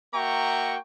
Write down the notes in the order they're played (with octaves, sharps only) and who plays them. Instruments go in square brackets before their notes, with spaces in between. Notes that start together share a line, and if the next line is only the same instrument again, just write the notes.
[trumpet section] A#3 F#4 E5 G5 A#5 C#6